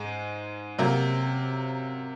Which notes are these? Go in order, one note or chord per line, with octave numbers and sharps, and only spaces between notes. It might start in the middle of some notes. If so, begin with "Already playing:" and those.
Already playing: G#2 G#3
C3 F#3 A#3